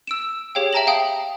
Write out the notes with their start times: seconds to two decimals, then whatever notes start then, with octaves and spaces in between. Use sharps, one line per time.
0.07 E6 D7 E7
0.55 G4 G#4 C#5 F5 G5
0.73 E5 G5 A5 A#5 A#6 F#7
0.87 F5 G5 D#6